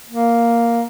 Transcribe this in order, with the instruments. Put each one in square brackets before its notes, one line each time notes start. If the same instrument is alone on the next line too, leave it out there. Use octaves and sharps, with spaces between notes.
[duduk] A#3